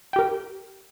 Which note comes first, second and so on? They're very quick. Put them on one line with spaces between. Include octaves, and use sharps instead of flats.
G5 G4 A#4